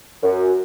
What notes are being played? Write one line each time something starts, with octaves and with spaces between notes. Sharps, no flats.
F#2